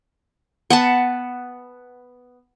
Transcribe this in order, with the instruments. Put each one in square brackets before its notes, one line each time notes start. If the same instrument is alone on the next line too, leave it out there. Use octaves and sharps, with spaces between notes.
[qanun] B3 F#5 A5